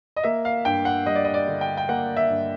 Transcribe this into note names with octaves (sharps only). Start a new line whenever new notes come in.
D#5
A#3 E5
F5
G2 G5
F#5
G3 D#5
D5
D#5
D5
D3
G5
G5
A#3 F#5
E5
G2